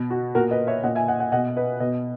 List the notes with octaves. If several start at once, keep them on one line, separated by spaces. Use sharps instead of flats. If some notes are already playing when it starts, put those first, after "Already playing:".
Already playing: B2
F#4
A#2 F#4 A#4
B4 D#5
C#5 E5
A#2 D#5 F#5
E5 G#5
D#5 F#5
D#5 F#5
B2 D#5 F#5
B4 D#5
B2 B4 D#5